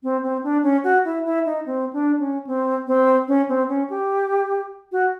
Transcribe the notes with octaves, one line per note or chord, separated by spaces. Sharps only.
C4
C4
D4
C#4
F#4
E4
E4
D#4
C4
D4
C#4
C4
C4
C#4
C4
C#4
G4
F#4